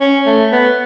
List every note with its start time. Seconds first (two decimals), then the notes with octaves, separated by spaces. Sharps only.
0.01 C#4
0.26 A3
0.52 B3